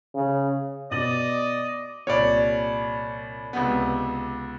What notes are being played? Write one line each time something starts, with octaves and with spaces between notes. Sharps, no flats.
C#3
B2 D5 D#5 D#6 A6 F#7
C2 A#2 C#5 D5
C#2 C3 B3